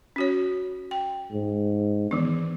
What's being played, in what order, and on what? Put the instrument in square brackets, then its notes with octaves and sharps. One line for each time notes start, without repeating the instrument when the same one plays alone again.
[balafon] C#4 F#4 C#5
G5
[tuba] G#2
[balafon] D#3 E3 D4 [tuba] B3